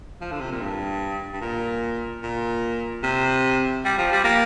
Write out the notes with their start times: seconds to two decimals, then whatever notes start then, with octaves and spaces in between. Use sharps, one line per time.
0.21 F3
0.31 D3
0.40 C3
0.51 A#2
0.61 G2
1.33 G2
1.41 A#2
2.23 A#2
3.03 C3
3.85 G3
3.98 F3
4.12 G3
4.24 A#3